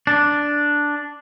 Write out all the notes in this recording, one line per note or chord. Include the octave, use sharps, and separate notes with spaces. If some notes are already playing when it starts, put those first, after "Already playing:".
D4